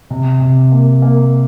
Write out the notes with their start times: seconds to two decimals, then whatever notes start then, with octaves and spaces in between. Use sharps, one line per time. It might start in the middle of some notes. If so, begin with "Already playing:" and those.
0.10 C3
0.41 C3
0.72 A#3
1.02 A#3